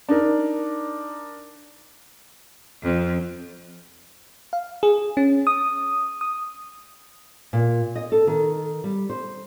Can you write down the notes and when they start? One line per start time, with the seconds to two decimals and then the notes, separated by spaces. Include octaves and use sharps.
0.09 D4 D#4 A#4
2.83 F2
4.53 F5
4.83 G#4
5.17 C#4
5.47 D#6
6.21 D#6
7.53 A#2
7.96 D#5
8.12 A4
8.27 D#3
8.84 G3
9.09 C5